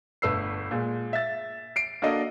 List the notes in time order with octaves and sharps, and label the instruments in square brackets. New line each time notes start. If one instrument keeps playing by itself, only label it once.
[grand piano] G1 A3 B4 E6 C7
A#2 G#3
E5 A6
C7 D7
A#3 D4 F#4 A4 D#5